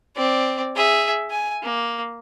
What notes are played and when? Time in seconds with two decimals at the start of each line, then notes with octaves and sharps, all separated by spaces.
0.16 C4 D5
0.76 G#4 E5
1.31 G#5
1.63 A#3